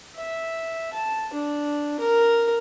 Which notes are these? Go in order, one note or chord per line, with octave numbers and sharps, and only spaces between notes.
E5
A5
D4
A#4